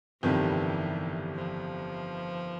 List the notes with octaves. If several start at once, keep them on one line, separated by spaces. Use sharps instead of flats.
G1 F2 C3 D#3 E3 G3
F3